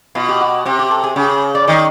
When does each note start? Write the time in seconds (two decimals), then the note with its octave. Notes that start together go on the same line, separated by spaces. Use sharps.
0.15 B2 F4
0.29 G4
0.41 F#4
0.65 C3 G4
0.79 G4
0.91 A4
1.04 G#4
1.16 C#3 G4
1.29 G#4
1.55 D5
1.67 D#3 D#5